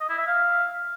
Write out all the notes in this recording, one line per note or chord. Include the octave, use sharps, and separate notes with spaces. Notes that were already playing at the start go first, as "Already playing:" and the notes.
D#5
E4
E5
F5